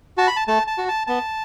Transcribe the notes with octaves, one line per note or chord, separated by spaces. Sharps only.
F#4 A5
B5
A5
A3 A5
A5
F#4
A5
B3 A5